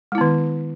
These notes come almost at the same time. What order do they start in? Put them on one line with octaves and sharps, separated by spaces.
G#3 E4 B3 D#3